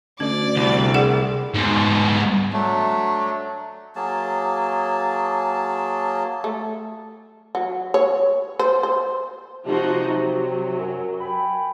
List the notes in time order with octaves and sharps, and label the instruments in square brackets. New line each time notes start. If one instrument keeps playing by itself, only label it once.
[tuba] D2 [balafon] C#4 [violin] D5
[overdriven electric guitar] C2
[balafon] G#4 F#5
[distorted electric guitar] G#2 B2
[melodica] F#3 A3 D4
F#3 A#3 G#4 A5
[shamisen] A3
F#3
C#5
C5
C5
[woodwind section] C3 [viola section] F3 D#4 F#4
[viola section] F#3
[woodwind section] F#2
G5 G#5 B5